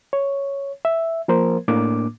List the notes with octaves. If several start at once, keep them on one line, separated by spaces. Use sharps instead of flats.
C#5
E5
F3 A#3 A#4 C5
A2 A#3 D4 D6